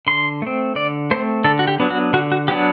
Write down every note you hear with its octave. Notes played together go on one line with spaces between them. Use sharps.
D3 C6
A3 C4
D3 D5
A3 C4 C5
D3 A4
F#4
G4
F#3 B3 D4
F#4
D3 F#4
F#4
F#3 B3 D4 G4